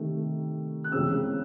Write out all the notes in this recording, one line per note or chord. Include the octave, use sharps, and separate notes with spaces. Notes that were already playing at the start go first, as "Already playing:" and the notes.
Already playing: C3 D#3 A3
F#6
E2 C#3 G#3 C4 E6